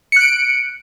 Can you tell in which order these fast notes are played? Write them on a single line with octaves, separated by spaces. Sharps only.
C#7 F#6 D7